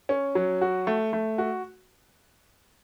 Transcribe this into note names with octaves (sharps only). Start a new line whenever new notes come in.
C#4
F#3
F#4
A3
A3
F#4